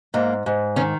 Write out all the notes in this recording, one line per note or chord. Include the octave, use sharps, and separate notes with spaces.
G#2 A#3
G#2
D#3 C#4